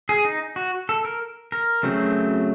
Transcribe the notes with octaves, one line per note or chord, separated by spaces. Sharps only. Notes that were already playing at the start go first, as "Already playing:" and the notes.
G#4
D#4
F#4
A4
A#4
A#4
C#3 F#3 A3 C4